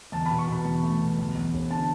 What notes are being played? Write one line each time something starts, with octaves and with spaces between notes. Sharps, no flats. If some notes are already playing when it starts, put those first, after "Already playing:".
E2 A5
B5
B2
C#6
B2 B5
E2
A3
B2
E2
E2
E1
D3 A5